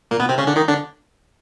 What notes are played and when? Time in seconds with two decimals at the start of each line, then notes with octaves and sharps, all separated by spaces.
0.11 A#2 A#3
0.20 B2 B3
0.29 C3 C4
0.38 C#3 C#4
0.47 D3 D4
0.56 D#3 D#4
0.68 D3 D4